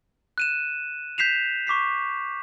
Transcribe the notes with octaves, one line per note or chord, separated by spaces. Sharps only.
F#6 D#7 E7
G6 B6 C7 E7 F7
C#6 D6 B6 C7